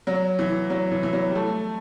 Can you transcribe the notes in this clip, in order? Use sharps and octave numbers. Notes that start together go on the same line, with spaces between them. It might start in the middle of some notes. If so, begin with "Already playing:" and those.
F#3
E3
F#3
E3
E3
F#3
G3
A3